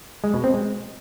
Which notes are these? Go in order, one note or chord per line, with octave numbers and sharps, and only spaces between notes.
G#3
B2
C4
G#3